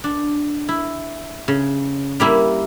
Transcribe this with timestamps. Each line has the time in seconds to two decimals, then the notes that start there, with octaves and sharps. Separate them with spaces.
0.04 D4
0.69 E4
1.48 C#3
2.20 G3 A#3 E4